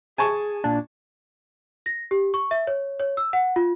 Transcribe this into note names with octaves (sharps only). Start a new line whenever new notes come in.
G#4 G#5 A5 C#6
A#2 D4
A#6
G4
C#6
E5
C#5
C#5
E6
F#5
F4